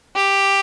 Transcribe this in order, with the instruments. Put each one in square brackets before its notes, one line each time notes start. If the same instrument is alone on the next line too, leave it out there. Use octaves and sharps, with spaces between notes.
[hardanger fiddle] G4